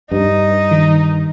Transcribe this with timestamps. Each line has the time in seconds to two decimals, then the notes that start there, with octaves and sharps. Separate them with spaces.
0.12 G2 D#4
0.71 D#3